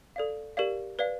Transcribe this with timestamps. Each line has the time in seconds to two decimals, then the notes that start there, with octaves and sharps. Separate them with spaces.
0.16 A4 D5 F5
0.57 G4 A#4 D5 F5
0.99 B4 D5 F5